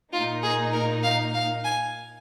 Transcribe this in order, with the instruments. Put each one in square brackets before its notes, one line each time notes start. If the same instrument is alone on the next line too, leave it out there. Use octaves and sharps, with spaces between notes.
[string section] A#2 A#3 D#4 [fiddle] F4
[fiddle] G#4
A#4
F5
F5
G#5